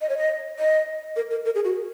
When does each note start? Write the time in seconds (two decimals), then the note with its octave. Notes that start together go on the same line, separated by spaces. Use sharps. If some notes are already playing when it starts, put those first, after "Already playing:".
0.01 D#5
0.09 C#5
0.17 D#5
0.59 D#5
1.16 A#4
1.30 A#4
1.45 A#4
1.55 G#4
1.65 F#4